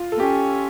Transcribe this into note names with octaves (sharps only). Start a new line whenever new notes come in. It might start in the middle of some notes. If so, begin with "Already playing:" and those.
Already playing: F4
A4
A#3
C#4 G4